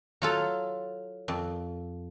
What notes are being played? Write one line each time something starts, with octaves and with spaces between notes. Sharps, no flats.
F#3 F4 A4
F2